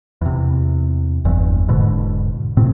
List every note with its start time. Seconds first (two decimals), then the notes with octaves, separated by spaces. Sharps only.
0.22 E2 C3
1.25 F#1 E2 G2 E3
1.68 E1 G#2 B2 D3
2.57 A2 C3 C4